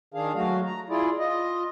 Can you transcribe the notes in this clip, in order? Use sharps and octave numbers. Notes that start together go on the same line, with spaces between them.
D#3 D4 G#4 F5
F#3 G#3 A3 F#4 F5
A#5
E4 F4 G#4 D5
F4 D#5